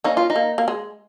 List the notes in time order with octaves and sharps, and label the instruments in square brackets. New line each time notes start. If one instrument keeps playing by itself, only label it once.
[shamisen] A#3 C#4 [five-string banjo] D#4
[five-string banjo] F4
D#4
[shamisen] A#3
A#3
G#3